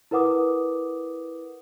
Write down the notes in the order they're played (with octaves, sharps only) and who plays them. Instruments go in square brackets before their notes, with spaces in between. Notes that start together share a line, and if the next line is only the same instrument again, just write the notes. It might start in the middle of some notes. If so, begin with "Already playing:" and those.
[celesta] E4 A#4 B4 F#5 D6 D#6